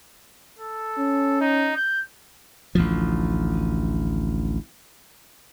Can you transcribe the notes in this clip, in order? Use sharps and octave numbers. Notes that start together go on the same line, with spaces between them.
A4
C#4
D#4
G6
A1 D2 F3